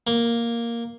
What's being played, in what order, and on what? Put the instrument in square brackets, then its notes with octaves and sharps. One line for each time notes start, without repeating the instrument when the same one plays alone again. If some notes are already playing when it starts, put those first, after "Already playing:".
[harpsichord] A#3